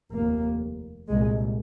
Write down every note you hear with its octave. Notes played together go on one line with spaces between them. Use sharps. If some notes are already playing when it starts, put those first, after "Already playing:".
F1 D#2 A#3
C2 A#2 G#3